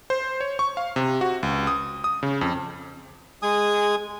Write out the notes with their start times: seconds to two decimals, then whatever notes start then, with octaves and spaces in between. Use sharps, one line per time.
0.10 C5
0.41 C#5
0.59 C#6
0.77 F5
0.96 C3
1.21 F#4
1.43 C#2
1.67 D#6
2.04 D#6
2.23 C#3
2.41 F2
3.42 G#3 G#5 D#6